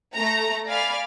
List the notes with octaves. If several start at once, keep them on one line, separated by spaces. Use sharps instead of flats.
A3 A#5
D5 F5 G#5 B5 F6